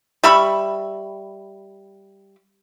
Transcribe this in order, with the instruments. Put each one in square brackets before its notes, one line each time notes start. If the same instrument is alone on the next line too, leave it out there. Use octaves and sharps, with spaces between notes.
[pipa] G3 E5 B5 C#6